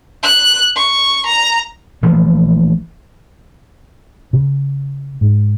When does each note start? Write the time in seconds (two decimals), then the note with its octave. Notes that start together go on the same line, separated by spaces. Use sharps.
0.23 F#6
0.77 C#6
1.25 A#5
2.03 A#1 E3 F3 A3
4.33 C#3
5.21 G#2